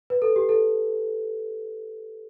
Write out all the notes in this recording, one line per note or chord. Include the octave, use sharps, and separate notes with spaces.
B4
A4
G4
A4